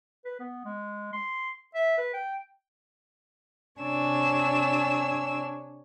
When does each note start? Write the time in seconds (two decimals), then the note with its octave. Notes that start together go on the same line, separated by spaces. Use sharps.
0.25 B4
0.40 B3
0.65 G#3
1.13 C6
1.75 E5
1.97 B4
2.14 G5
3.80 C3 D4 C#5 G#5 E6